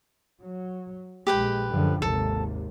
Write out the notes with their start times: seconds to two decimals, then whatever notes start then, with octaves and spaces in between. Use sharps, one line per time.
0.41 F#3
1.27 A#1 G#3 G4 B4 G5
1.69 F#2 D3 F3
2.02 G#1 D#2 C3 A4